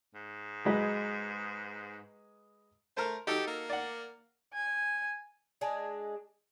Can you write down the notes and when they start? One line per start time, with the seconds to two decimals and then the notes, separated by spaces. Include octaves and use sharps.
0.15 G#2
0.65 F#3 G#3 B4
2.97 A3 A#4 C5
3.27 D#4 F#4 G4 A4
3.47 A#3
3.70 D5 F#5
4.53 G#5
5.61 G#3 D4 G#4